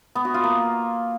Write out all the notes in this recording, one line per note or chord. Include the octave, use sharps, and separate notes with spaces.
B3
F#4
F4
A#3